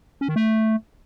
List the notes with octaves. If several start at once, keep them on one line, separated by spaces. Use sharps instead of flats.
C#4
D#3
A3